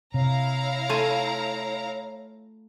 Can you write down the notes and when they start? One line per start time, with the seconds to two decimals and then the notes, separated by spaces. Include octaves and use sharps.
0.14 C3 E4 C#5 F5 A#5
0.89 A3 F4 G#5